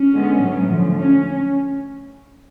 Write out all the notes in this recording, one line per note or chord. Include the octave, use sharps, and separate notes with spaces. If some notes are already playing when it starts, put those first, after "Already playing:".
Already playing: C#4
D3 G#3 B3
A2 F#3 B3
D3 F3 A3
C#4